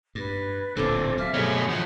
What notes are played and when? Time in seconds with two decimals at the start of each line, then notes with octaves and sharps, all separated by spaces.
0.15 G2 B4
0.76 D1 A#2 D3 C4 D4 A4 D6
1.18 F#3 E5 F5 F6
1.34 B2 A3 G4 G#4 C#5 D#5
1.69 F3 F#3 C5 C#5 F#5 G6